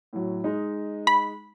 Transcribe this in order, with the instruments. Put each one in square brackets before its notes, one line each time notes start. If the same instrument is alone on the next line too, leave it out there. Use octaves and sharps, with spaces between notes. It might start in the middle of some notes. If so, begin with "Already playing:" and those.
[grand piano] A2 F#3
G#3 D#4
[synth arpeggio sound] B5